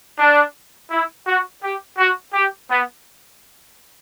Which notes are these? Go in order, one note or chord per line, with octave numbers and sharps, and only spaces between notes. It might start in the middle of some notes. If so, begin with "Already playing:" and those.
D4
E4
F#4
G4
F#4
G4
B3